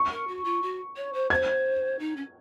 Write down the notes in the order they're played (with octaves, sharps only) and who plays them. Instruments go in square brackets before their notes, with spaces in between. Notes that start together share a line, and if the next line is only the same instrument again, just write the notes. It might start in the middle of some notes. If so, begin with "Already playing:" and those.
Already playing: [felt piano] C#6
[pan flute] A#4
F#4
F4
F#4
C#5
C5
[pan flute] C5 [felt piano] G#6
[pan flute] D#4
C#4